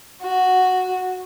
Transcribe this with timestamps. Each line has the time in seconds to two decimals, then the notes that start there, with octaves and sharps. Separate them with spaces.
0.22 F#4